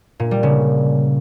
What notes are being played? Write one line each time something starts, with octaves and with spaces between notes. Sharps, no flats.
A#2
G3
C#3